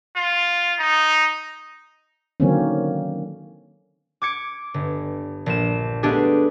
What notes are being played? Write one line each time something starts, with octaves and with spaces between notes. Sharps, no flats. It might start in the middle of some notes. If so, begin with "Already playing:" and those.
F4
D#4
D3 D#3 F#3 A#3 C4 C#4
D6 G#6 C#7 D7
G1
A#1 E7
G#3 A3 B3 D4 G4 G#4